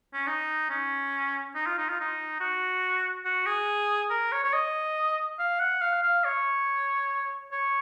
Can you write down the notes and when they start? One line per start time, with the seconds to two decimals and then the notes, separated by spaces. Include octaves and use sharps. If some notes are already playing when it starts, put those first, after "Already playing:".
0.14 C#4
0.27 D#4
0.70 C#4
1.55 D#4
1.66 F4
1.78 D#4
1.89 F4
2.00 D#4
2.40 F#4
3.25 F#4
3.46 G#4
4.10 A#4
4.32 C#5
4.44 C#5
4.53 D#5
5.39 F5
5.60 F#5
5.81 F5
6.02 F5
6.24 C#5
7.52 C#5